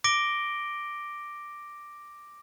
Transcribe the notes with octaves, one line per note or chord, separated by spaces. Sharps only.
D6 A#6 D7 G7